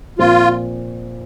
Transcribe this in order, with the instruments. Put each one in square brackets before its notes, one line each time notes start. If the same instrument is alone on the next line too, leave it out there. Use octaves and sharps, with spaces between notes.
[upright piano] A#2 F3 C4 [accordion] F4